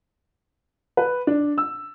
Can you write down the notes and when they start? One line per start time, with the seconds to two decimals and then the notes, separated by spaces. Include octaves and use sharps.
0.97 B4
1.27 D4
1.58 E6